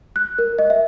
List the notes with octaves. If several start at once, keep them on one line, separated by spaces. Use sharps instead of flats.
F#6
A#4
D#5
E5